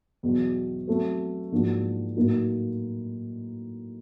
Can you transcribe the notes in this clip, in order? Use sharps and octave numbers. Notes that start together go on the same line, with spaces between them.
E2 B2 F#3
F#3 A3 C4
G#2 F3 A#3 D4 F#4
A2 F#3 A#3 D#4